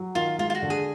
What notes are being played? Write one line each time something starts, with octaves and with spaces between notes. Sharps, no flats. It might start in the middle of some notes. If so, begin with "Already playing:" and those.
Already playing: F#3
D#3 F4
G#3 F4
F4
F#4
D3
G#4